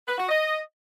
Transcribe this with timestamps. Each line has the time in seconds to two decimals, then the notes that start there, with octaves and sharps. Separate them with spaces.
0.07 B4
0.18 F#4
0.29 D#5